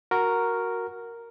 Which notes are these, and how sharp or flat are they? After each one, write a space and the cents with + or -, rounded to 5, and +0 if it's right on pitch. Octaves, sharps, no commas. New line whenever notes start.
F#4 +0 A#4 +0